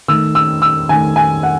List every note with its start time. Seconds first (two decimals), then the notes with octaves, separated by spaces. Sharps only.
0.08 D#3 A3 E6
0.35 E6
0.62 E6
0.89 D#3 A3 G#5
1.16 G#5
1.43 F#5